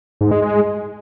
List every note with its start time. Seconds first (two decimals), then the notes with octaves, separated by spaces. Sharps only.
0.21 G#2
0.31 G#3
0.42 G#3